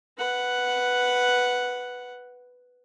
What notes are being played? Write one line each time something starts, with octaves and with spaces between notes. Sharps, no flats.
B4 F#5